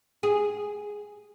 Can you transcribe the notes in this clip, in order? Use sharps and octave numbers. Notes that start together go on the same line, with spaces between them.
G#4